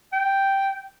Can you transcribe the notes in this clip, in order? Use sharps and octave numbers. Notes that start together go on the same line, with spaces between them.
G5